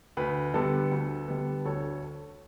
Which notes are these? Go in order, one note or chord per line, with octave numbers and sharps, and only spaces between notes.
D2 B4
D3 G3 B3 A4
D2
D3 G3 B3
D2 A4 C#5